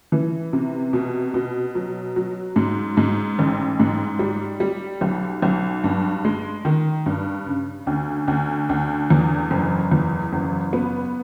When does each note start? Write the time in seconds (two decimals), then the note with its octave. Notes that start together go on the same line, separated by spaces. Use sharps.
0.12 E3
0.53 C3
0.93 B2
1.34 B2
1.75 F#3
2.16 F#3
2.56 G#2
2.97 G#2
3.39 A1
3.80 G#2
4.19 G3
4.60 G3
5.01 B1
5.42 B1
5.84 G2
6.25 G#3
6.65 D#3
7.06 G2
7.47 C#3
7.87 D2
8.28 D2
8.69 D2
9.10 E2
9.51 F#1
9.92 E2
10.33 F#1
10.73 B3